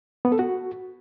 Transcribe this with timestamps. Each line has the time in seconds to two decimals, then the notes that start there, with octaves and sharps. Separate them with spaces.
0.25 B3
0.32 A4
0.39 F#4